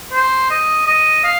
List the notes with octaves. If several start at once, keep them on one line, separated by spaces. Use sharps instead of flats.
C5
D#5
D#5
F5